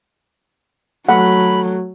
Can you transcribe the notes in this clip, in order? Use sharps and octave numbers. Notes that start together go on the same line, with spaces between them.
F#3 A3 F#5 B5